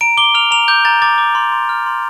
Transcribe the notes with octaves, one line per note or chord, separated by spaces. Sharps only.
A#5 D7
D6 G7
F6 F7
A#5 F7
D6 G6
A#5 A6
D6 A6
D6
C6
C6
F6
C6